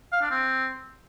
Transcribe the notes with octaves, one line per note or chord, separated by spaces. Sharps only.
F5
D4
C4